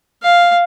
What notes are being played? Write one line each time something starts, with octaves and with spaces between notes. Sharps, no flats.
F5